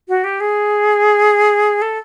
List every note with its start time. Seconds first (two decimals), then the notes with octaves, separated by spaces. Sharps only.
0.09 F#4
0.24 G4
0.40 G#4
1.82 A4